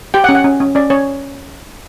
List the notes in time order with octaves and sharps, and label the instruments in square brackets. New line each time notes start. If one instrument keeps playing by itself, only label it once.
[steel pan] G4 G5
F#5
C#4
F#5
C#4
C#4
C#4 D5
C#4 C#5